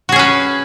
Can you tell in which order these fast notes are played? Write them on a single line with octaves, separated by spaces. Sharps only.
F#4 G#4 C#4 B4